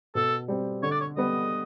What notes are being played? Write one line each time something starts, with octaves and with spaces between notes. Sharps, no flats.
B2 A4
G3 C4
D3 C#5
D5
C#5
G3 B3 D#5